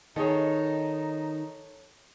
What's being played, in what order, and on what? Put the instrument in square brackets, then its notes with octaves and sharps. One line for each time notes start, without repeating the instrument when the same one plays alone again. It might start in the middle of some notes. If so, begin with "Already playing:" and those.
[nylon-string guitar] D#3 [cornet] D#4 [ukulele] G#4 D#5 [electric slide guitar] A4 C#5